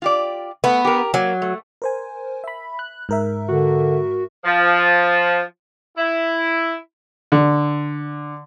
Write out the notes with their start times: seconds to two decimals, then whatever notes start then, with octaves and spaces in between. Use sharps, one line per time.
0.02 F4 G4 D5
0.64 A3 B3
0.85 G4 A#4
1.14 F#3 A#3
1.42 A3
1.82 A#4 C5 G#5
2.44 E5 B5
2.79 F#6
3.09 G#2 A#4 E5
3.48 D3 F#4
4.44 F3
5.97 E4
7.32 D3